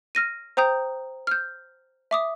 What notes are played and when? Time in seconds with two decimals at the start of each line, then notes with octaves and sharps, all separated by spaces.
0.15 F6 A#6 D#7
0.57 C5 G5 A#5 D#6 G6
1.27 F6 G6
2.11 E5 D6 D#6